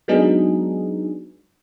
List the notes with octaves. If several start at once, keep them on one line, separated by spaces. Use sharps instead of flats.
F#3 G#3 B3 D4 D#4 G#4